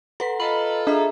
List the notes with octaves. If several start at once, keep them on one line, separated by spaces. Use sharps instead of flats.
A4 B4 F#5 B6
F4 A4 B4 D#5 A#5 B5 F#7
D4 G#4 D#5 E5 A#5